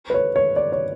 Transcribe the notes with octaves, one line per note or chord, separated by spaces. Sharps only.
B4
C#5
C#5
D5
C#5